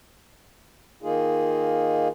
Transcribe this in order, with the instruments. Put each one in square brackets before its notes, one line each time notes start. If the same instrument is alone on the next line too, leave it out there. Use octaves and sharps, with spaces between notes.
[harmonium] D#3 A#3 D#4 F4 G#4